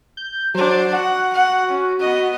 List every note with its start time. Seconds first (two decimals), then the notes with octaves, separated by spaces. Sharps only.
0.17 G6
0.55 F#3 D4 C5
0.93 F#4 F#5
1.34 F#5
1.67 C#4
2.00 B3 D#5